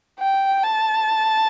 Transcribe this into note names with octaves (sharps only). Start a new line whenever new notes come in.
G5
A5